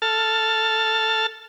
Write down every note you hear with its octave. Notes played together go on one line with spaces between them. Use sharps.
A4 A5 F6